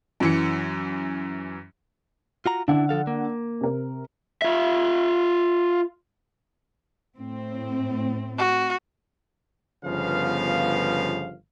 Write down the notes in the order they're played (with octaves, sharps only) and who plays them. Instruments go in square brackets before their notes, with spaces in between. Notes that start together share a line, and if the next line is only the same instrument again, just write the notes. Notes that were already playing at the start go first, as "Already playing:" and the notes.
[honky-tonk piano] F#2 E3 C#7
[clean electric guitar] F4 F#4 A#5
[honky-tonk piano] D3 F#5 [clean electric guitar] D4 E4
[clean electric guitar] F3 A4 F5
A#3
[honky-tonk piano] C3 A#4
[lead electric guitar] F4 E5
[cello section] A2 C4
[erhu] F#4
[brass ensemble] G1 C#3 F3 B3 F5